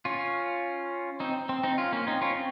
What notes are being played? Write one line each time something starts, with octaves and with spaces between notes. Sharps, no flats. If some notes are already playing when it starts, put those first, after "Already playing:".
C#4 F4
C4 D#4
C4
C4 D#4
C#4 F4
A#3 C#4
C4 D#4
C#4 F4
C4